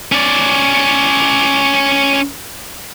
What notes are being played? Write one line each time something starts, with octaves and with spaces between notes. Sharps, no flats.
C#4 D5